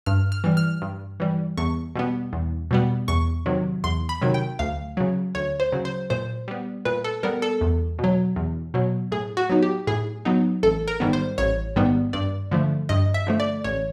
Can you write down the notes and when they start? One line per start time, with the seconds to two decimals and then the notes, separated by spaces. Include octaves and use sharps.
0.06 G2 F6
0.32 F6
0.44 E3 G3
0.57 F6
0.82 G2
1.20 E3 G3
1.58 E2 C#6
1.95 B2 G3 B3
2.33 E2
2.71 B2 G3 B3
3.08 E2 C#6
3.46 C3 D#3 F#3
3.84 E2 C6
4.09 B5
4.22 C3 D#3 F#3
4.34 G5
4.59 D2 F5
4.97 C#3 F#3
5.35 D2 C#5
5.60 C5
5.73 C#3 F#3
5.85 C5
6.10 A#2 C5
6.48 G3 B3
6.85 A#2 B4
7.05 A4
7.23 G3 B3 A#4
7.42 A4
7.61 E2
7.99 B2
8.04 F#3
8.36 E2
8.74 B2 F#3
9.12 A2 G#4
9.37 F#4
9.50 F#3 B3 D#4
9.62 G4
9.87 A2 G#4
10.25 F#3 B3 D#4
10.63 A1 A4
10.88 A#4
11.00 G#2 D#3 G3 B3
11.13 C5
11.38 A1 C#5
11.76 G#2 D#3 G3 B3
12.13 G2 D5
12.51 D3 F3 A3
12.89 G2 D#5
13.14 E5
13.27 D3 F3 A3
13.40 D5
13.64 A1 C#5